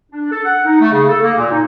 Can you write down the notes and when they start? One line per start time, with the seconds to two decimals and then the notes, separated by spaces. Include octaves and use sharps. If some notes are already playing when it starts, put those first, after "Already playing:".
0.12 D4
0.32 A4
0.45 F#5
0.66 D#4
0.81 A3
0.92 C#3
1.09 A4
1.23 A#3
1.38 A#2
1.52 D#4